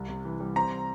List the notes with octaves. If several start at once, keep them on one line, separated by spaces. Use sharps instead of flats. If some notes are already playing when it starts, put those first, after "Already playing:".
Already playing: C2
C3
E3
G3
C4 A#5